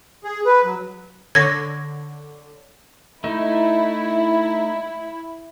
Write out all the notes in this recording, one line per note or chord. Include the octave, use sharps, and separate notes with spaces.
G#4
B4
F#3
D3 C#5 C#6 G#6 A#6
A3 D#4 E4